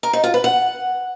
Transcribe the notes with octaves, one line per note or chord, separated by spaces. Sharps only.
A#4
D#4
F4
B4
F#5